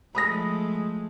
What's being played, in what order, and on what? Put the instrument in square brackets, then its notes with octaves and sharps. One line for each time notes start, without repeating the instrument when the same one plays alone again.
[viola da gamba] F3 G#3 A3 [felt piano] B5 D#6 A#6